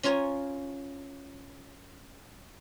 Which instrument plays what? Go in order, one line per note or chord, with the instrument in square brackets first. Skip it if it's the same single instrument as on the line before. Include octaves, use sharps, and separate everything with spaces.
[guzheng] C#4 F4 A#4 C#5 G#5